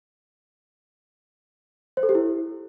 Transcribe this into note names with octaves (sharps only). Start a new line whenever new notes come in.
C5
A4
G4
E4